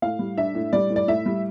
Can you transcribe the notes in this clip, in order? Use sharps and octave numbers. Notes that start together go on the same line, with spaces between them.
A2 F5
G3
D4 E5
A2
G3 D5
A2
D5
A2 E5
G3